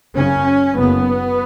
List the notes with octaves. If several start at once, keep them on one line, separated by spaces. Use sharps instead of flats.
F#1 F#2 C#3 C#4
F#1 F#2 C#3 B3